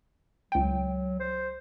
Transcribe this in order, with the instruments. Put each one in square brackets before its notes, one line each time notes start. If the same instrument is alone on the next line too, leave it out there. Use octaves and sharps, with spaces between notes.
[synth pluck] C#2 G5 [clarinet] F#3
[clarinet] C5